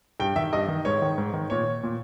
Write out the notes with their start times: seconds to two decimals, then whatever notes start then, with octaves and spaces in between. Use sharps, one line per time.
0.20 G2 G5
0.36 D#3 E5
0.53 G2 D#5
0.68 D#3
0.85 G#2 C#5
1.02 D#3
1.18 G#2
1.34 D#3
1.50 A#2 C#5
1.83 A#2